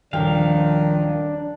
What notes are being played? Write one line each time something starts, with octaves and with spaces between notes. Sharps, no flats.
D#1 D#3 F3 D4 F5 G5